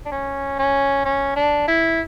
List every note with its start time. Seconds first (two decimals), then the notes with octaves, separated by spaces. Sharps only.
0.06 D4
0.11 C#4
0.59 C#4
1.05 C#4
1.36 D4
1.68 E4